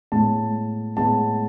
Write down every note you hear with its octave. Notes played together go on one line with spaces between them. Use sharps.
A2 G#3 B3 A5
A2 G#3 B3 A5